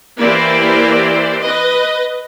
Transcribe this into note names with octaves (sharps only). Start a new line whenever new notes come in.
E3 A#3 E4 G4 C5 D5
B4 D#5